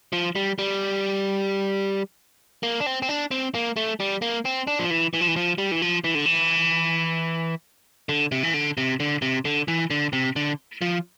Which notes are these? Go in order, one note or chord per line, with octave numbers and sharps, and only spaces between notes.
F3
G3
G3
A#3
D4
C4
C4
D4
C4
A#3
A3
G3
A#3
C4
D4
F3
E3
E3
F3
E3
F3
G3
E3
F3
E3
D3
E3
D3
C3
E3
D3
C3
D3
C3
D3
E3
D3
C3
D3
F3